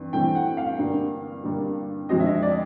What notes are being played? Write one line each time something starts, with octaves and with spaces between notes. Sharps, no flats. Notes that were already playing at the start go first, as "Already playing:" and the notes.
Already playing: G2 E3 C4
G2 E3 A3 C4 G5
F#5
F5
G2 D3 G3 A#3 D4
G2 D3 G3 A#3 D4
F2 D3 F3 G#3 C4 D#5
E5
D#5
D5